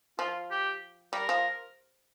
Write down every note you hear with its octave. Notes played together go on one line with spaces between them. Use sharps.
F3 F4
G4
G3 A#4
F3